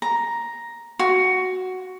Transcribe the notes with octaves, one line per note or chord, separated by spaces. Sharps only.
A#5
F#4